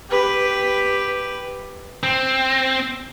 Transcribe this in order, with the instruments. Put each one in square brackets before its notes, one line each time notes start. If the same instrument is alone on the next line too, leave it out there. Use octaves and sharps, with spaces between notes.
[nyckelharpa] G4 B4
[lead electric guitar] C4